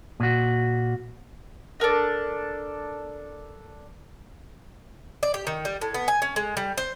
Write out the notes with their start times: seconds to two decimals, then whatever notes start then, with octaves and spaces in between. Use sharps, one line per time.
0.20 A#2 F#4
1.80 D4 A4 A#4 D#5
5.23 D5
5.34 G4
5.47 D#3
5.65 G3
5.81 A2
5.94 B3
6.08 G#5
6.22 C#4
6.36 G#3
6.57 G3
6.78 C5